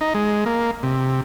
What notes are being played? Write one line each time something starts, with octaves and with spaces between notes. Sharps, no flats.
D#4
G#3
A#3
C3